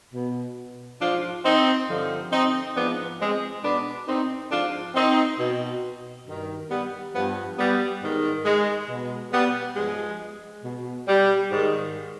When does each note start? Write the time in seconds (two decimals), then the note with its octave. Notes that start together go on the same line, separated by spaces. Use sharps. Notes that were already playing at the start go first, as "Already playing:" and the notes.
0.14 B2
1.02 G#2 F3 D4 F4
1.45 C4 D#4
1.89 G2 D3 F3
2.32 C4 D#4
2.76 G#2 F3 B3 D4
3.20 G#3 C4
3.64 B2 B3 D4
4.08 C4 D#4
4.51 G#2 F3 D4 F4
4.95 C4 D#4
5.39 B2
6.27 G2 D#3
6.70 G3 B3
7.14 G2 F3 G3 B3
7.58 G3 B3
8.02 G#2 D#3
8.45 G#3
8.89 B2
9.33 G3 B3
9.76 G2 F3 G#3
10.64 B2
11.08 G3
11.51 G#2 D#3